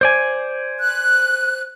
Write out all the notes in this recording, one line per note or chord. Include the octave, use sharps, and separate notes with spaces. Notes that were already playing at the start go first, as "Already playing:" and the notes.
C5 D5 G#5
F#6